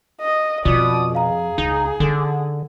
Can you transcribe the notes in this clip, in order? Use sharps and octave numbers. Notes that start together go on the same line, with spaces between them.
D#5
F2 B2 F4 D5 D#6
G#4 F5 A#5
C#2 D#4
D3 D#4 A4